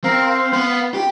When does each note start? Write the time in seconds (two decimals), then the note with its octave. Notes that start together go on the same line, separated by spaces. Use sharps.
0.04 C4 A#4 F5
0.30 F5
0.53 B3
0.94 G4